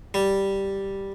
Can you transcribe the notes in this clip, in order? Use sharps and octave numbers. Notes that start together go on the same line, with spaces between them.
G3